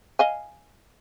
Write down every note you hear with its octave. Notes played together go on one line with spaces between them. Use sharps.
D#5 F5 G#5